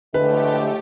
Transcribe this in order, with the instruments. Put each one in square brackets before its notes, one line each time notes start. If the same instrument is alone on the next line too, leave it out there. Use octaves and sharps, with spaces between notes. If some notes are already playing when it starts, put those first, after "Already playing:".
[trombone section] A2 F3 G#3 [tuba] D3 [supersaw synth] A3 G4 [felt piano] B4